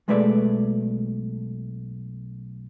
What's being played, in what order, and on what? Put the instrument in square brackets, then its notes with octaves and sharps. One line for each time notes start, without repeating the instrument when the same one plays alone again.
[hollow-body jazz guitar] B1 G#3 A3 B4 D5 E5